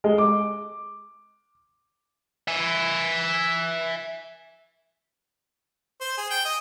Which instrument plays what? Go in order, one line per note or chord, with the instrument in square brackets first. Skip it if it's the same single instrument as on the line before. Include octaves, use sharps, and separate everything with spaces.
[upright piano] G#3
D6
[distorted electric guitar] E5 G#5
[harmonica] C5
G#4
G5
D#5